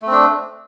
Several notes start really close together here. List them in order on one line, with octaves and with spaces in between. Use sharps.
A3 C4 D4